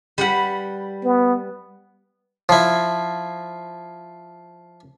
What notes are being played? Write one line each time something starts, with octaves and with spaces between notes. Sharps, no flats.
G3 B4 F#5
B3
F3 E4